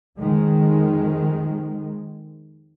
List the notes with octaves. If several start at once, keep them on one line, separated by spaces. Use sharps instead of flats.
F2 D#3 G#3